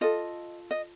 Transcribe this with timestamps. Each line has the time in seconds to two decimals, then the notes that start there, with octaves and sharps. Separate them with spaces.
0.01 F4 A4 D#5
0.71 D#5